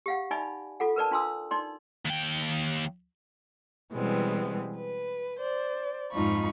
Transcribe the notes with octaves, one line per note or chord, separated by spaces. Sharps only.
G4 F5 F#5
D#4 D5 E5 G#5 B5
F4 A4 F#5
A#4 B4 D5 A5
D4 F4 C6 D#6 E6
D#4 D5 C6
D#2 G5
B2 E3 G3 G#3 B3 C4
B4
C5 D5
F2 G#2 D#4 F4 B5 C#6